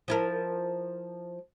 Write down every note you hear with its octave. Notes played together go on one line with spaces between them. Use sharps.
F3 E4 A#4